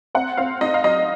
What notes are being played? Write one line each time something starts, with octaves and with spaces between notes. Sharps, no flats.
C4 F#5
C4 F5
D#4 D#5
F5
F#3 D#5